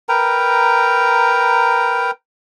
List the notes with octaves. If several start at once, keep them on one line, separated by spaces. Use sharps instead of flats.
A#4 B4 G5 A#5